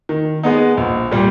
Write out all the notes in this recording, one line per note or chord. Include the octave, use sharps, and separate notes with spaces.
D#3
G#3 B3 D#4
A#1
A#2 G3